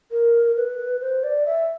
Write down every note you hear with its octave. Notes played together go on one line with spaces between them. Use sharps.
A#4
B4
C5
D5
E5